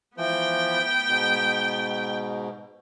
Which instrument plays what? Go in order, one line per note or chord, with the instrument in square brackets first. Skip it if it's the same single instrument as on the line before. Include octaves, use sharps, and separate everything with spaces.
[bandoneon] E3 F3 [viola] B3 G5
[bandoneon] G#2 B2